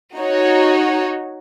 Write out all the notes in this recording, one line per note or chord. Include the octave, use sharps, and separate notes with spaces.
D#4 F#4 C#5